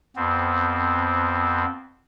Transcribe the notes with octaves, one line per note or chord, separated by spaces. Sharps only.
F2 B3 C4